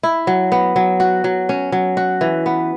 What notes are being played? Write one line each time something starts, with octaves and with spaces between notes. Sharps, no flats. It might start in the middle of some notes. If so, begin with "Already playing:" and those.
E4
F#3
B3
F#3
F#4
F#3
C#4
F#3
F#4
E3
B3